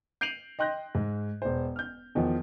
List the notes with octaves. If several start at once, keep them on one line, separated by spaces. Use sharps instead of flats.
G6 C7 D7 D#7 F7 F#7
D#5 G5 C6 F#6 G6 A#6
G#2
E1 C5
F6 G6
E2 D#3 F3